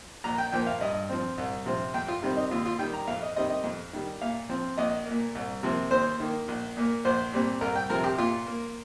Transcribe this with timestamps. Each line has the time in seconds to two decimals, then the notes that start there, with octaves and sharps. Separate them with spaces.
0.24 A#1 A#5
0.38 G5
0.52 A#2 F3 A#3 G5
0.67 F5
0.81 G2 D#5
1.09 F3 C4
1.38 C2
1.66 C3 F3 C4
1.94 F2 G5
2.08 F4
2.22 C3 D#3 G3 C4
2.37 D#4
2.51 D#2 F4
2.66 F4
2.79 D#3 G3 G5
2.93 A#5
3.08 F2 F5
3.22 D#5
3.36 D#3 G3 C4 D#5
3.51 D#5
3.64 F2
3.93 D#3 G3
4.21 A#2 F5
4.49 F3 C4
4.78 A#1 D#5
5.06 A#2 A#3
5.35 C2
5.63 C3 F3 A#3
5.91 D#2 C5
6.20 D#3 A#3
6.48 A#1
6.77 A#2 A#3
7.05 A#1 C5
7.33 A#2 G3 C4
7.61 C2 A#4
7.76 G5
7.90 C3 F3 A#4
8.04 G4
8.18 A#2 F4
8.47 A#3